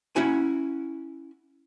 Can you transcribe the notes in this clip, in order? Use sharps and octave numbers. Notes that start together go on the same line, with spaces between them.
C#4 E4 F#4 G#5